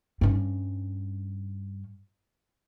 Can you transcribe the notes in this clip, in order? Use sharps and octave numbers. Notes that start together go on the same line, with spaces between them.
G2 C#4